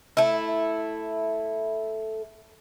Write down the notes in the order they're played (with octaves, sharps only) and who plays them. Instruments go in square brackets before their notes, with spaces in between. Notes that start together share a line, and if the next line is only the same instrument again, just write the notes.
[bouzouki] A3 E4